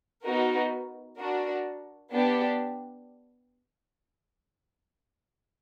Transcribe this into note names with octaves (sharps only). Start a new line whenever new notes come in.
B3 D#4 F#4 A#4
D4 F#4 A#4
B3 D4 G4